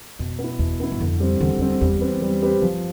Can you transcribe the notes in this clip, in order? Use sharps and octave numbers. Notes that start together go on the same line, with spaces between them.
F2 B2
B3
E4
E2 B2
B3 E4
G2
F2 D3
G3 C4
E2 D3
E2 G3 C4
E2 G3
C4 G4 B4
G3
C4 G4 B4
G2 F3